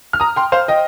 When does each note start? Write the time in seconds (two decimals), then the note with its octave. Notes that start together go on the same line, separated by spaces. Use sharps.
0.13 F6
0.20 A#5 D#6
0.36 G5 C6
0.52 C5 F5
0.68 D#5 G5